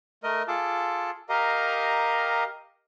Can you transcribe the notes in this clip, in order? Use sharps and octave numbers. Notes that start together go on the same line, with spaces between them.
A3 A#4 D#5
F4 G#4 A4 A5 D6
G4 A#4 D#5 F5 A#5